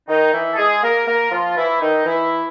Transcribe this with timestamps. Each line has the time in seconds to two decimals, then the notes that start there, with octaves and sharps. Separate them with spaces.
0.08 D#3 D#4
0.33 E3 E4
0.52 A4
0.57 G#3 G#4
0.82 A#3 A#4
1.07 A#3 A#4
1.31 F3 F4
1.56 E3 E4
1.81 D#3 D#4
2.06 E3 E4